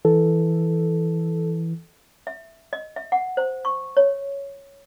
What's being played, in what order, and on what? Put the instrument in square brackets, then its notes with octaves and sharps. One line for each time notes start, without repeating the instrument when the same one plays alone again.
[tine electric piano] E3 [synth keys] A4
[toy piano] E5
D#5
E5
F#5
C5
C#6
C#5